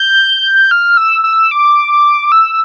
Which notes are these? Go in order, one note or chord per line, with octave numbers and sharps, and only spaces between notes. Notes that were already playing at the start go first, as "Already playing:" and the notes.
Already playing: G6
F6
E6
E6
D6
E6